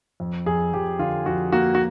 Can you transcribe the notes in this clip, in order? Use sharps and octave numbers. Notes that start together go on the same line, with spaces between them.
F2
F2 G#4
F2 G4
D3 F4
F2 F#4
A#3 F#4
F#4